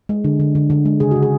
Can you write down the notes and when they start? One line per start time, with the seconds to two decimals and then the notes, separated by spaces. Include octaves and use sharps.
0.09 G#3
0.24 D3
0.40 D3
0.55 D3
0.70 D3
0.86 G#3
1.00 C#3 G#4
1.11 C#3 F#4
1.23 G#4